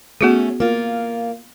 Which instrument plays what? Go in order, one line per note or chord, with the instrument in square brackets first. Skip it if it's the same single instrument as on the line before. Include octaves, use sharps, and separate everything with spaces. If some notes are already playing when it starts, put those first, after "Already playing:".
[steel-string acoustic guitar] A3 C#4 [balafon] B3 F#4 G#4
[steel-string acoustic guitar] A#3 F4